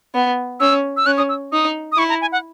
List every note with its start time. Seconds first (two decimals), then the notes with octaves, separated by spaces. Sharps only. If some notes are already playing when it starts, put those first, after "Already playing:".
0.15 B3
0.60 C#4 E6
0.97 E6
1.06 C#4 F#6
1.18 D#6
1.29 E6
1.52 D#4 D#6
1.92 D#6
1.98 E4 C#6
2.09 A#5
2.21 G#5
2.32 F#5